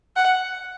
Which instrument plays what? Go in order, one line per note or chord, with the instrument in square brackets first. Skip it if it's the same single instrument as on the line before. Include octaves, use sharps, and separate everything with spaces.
[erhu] F#5